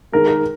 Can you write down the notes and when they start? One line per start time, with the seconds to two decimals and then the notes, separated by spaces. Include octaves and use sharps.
0.12 D#3 G#3 A#4
0.28 A#4